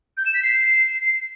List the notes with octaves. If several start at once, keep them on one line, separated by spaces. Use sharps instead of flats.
G6
E7
B6
C7